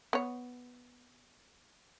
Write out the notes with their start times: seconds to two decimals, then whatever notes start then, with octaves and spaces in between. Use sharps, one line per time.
0.13 B3 C#5